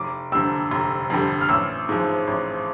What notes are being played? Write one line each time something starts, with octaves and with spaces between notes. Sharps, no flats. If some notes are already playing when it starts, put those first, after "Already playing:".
Already playing: F1 D6
F2 D3 G3 E6
F1
F2 D3 G3
F6
A1 E6
G#2 F3
A1